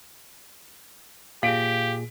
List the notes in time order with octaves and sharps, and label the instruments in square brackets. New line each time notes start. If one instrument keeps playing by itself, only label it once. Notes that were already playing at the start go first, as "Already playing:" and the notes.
[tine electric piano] A#2 G#4 [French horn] G4 [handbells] F5 [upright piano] B6 D7